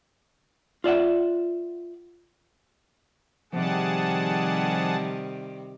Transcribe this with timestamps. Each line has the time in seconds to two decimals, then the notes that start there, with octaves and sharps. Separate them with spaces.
0.84 F4 D5 E5 F#5
3.53 C3 D#3 F3 G3 G#4 F#5 A5